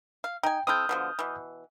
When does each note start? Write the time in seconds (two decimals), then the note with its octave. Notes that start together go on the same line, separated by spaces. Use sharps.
0.24 F5
0.43 D#4 G5 G#5
0.67 C4 E4 A4 D#6 F6 G6
0.89 B2 D3 F3
1.19 B2 E3